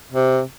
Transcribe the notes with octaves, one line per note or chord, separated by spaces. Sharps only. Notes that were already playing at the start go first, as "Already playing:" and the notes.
C3